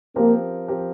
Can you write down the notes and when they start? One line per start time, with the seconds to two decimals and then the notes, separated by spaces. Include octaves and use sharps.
0.16 F3 A#3 C4 G4 A#4
0.68 F3 C4 G4 A#4